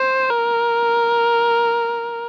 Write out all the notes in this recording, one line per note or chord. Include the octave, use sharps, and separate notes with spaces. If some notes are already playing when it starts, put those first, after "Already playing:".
Already playing: C5
A#4